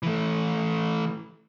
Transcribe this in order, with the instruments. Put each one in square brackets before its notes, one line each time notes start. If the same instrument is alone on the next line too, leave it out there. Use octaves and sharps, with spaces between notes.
[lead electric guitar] E3 A3